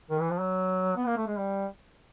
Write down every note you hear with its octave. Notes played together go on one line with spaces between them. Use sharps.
D#3
E3
F3
F#3
B3
A#3
A3
G#3
G3